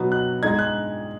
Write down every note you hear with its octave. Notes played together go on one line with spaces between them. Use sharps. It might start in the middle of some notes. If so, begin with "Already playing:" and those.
Already playing: B2 F#3 B3 D#4
F#6
G#2 G#3 D#4 G#6
F#6